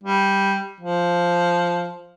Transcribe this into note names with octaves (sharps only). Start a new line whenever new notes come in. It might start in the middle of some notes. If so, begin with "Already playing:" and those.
G3
F3